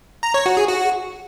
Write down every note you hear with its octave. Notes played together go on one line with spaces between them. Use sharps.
A#5
C#5
F#4
G#4
F#4